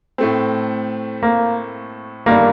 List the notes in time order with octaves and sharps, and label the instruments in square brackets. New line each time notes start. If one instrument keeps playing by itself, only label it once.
[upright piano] A2 A3 C4
[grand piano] A#3
[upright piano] G1 G2 D#3 G3 D4 [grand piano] A#3